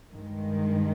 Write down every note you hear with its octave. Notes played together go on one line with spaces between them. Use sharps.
G2 D#3 G#3